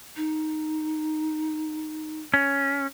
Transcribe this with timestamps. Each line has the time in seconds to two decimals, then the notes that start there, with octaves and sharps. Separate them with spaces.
0.16 D#4
2.34 C#4